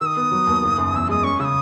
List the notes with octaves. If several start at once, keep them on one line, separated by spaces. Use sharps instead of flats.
D#3 D#6 E6
B3
F#3
D#2
F#1
F#2
E2 E6
G#3 D#6
C#4 C#6
C#3 E6
D#6